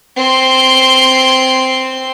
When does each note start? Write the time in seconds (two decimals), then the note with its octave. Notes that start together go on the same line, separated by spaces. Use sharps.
0.17 C4 C6